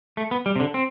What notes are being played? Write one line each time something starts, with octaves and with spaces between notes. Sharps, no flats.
A3
B3
G3
C3
D3
C4